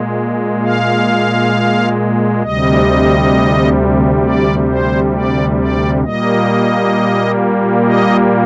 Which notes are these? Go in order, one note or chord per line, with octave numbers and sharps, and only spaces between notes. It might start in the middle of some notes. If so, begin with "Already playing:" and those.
Already playing: A#2 G#3
F5
D2 C3 G3 D#5
D5
C5
D5
D5
A#2 G3 A#3 D#5
D#5